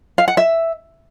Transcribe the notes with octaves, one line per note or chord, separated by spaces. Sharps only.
F5
F#5
E5